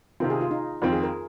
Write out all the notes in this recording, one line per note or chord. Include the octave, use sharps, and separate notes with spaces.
C3 D#3 C4 F4
G#4
F4
D#4
F2 D#3 C4 F4
G#4
A#4